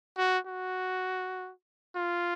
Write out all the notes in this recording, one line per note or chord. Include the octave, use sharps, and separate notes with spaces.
F#4
F#4
F4